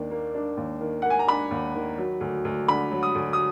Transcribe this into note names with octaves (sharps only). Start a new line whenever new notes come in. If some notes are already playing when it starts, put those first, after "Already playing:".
Already playing: D#2 D#3 A#3 D4
A#3
D4
D#2
D#3
A#3 F#5
G#5
A#5
D4 B5
D#2
D#3
F#3
D2
D2
D3 B5
F#3
D#6
D2
D#6